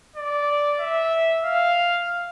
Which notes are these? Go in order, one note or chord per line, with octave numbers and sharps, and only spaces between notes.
D5
E5
F5